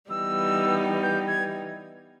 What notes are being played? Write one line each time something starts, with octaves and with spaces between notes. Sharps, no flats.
E3 G3 B3 D#4 E6
G6
G#6